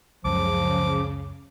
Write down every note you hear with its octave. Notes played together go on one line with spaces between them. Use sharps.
C#2 F#2 C#3 F3 D6